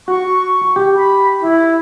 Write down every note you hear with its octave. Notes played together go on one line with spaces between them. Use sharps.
F#4 C#6
G4
B5
E4